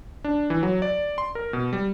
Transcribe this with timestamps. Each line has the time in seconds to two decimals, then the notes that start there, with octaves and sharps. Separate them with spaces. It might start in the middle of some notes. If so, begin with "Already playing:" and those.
0.24 D4
0.50 E3
0.63 F#3
0.82 D5
1.18 C6
1.35 A#4
1.53 B2
1.73 G3